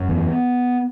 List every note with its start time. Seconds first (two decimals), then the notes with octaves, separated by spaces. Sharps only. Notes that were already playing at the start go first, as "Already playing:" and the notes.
Already playing: F#2
0.08 E2 B3